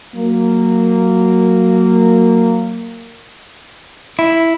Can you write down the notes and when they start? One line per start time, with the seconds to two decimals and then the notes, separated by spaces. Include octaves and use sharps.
0.15 F#3 A#3
4.19 E4